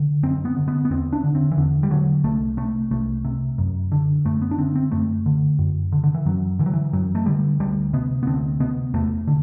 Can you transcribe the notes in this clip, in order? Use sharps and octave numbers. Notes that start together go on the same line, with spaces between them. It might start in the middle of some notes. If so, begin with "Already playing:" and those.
Already playing: D3
F#2 C4
B3
D3
B3
B3
E2 C4
D4
D3
C4
E3
E2 D3
G3
D3 F#3
C2 A3
C3 A3
C2 A3
C3
F#2
D3
F#2 A3
B3
D4
D3 C4
C4
F#2 A3
D3
F#2
D3
D3
E3
F#2 F#3
D3 E3
F#3
E3
F#2 F#3
A3
D3 G3
D2 G3
C3 B3
B3
D2 C4
C3 B3
E2 A3
D3